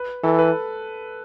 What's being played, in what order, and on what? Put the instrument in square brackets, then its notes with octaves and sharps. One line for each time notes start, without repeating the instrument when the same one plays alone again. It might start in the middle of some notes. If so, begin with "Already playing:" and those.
Already playing: [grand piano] B4
[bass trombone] E3 [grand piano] A4
[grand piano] B4